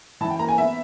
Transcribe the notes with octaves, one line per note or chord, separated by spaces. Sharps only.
E3 A5
G5
A#3 A#5
G#5
B3 E5